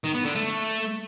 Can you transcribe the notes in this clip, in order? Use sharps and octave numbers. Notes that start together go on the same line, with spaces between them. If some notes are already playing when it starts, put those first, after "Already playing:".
D#3
B3
D3
A3